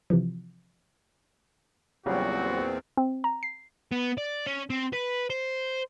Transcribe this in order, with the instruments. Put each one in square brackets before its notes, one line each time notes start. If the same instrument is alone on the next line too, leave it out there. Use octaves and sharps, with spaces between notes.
[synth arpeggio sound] C3 E3 F3
[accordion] E2 A#2 C4 [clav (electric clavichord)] C#3 F#3 G3 [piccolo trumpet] F#4
[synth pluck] C4
A#5
C7
[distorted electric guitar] B3
D5
C#4
C4
B4
C5